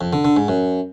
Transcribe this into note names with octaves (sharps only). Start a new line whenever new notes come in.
F2
D3
D3
G#2
F#2